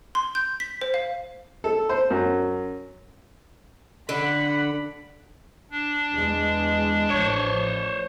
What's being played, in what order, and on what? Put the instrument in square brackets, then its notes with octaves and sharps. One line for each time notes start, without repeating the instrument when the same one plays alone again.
[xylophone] C6
G6
B6
C5
F5
[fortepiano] A4
C5
F#2
[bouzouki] D3 [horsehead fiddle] F#5 B5
[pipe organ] D4
[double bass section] E2 G#3
[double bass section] A1 A2 F3 [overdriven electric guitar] C5 C#5